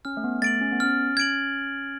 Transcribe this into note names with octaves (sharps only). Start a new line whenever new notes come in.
C#4 F6
A3
B3
A3 A6 D7 F#7
C#4
B3
C#4 F6
G#6 D7 F#7